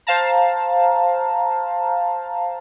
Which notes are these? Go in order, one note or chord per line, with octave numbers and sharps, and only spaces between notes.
C5 F5 A5 A#5